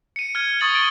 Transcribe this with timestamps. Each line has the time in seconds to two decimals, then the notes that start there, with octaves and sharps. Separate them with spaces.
0.16 C#7 D#7
0.35 F6 G#6
0.60 C#6 D#6 A6 F#7 G7
0.75 A6 D7